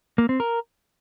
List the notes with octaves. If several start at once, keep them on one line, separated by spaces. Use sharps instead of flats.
A#3
C4
A#4